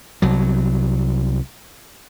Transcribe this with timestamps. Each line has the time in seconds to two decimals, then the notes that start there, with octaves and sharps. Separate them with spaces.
0.22 C2 F#3